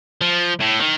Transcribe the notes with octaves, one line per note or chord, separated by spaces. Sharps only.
F3
A2
D#3